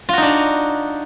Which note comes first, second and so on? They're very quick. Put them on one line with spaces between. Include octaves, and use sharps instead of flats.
F4 F#4 D#4 D4